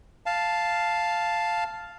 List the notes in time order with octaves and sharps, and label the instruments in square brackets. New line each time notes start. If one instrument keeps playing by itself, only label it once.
[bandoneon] F5 A5